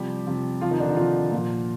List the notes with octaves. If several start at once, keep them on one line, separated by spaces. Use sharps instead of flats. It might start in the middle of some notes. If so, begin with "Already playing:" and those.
Already playing: C3 F3 G3 G4
C3 F3
C3 F3 F4
D#3 D#4
D3 D4
D#3 D#4
C3 F3 F4
A#2 F3